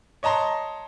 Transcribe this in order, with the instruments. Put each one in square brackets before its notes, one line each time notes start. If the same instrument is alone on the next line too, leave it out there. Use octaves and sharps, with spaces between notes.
[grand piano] C#5 D#5 A5 A#5 C6